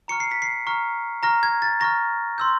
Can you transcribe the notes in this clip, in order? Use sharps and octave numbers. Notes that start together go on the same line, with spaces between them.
A#5 C#6 F6 C#7
C7
B6
C7
A#5 C#6 F6
A#5 C#6 F6 A#6
G#6
A6
A#5 C#6 F6 A#6
C6 E6 G6